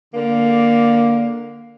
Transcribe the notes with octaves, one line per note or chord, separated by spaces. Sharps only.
D3 A#3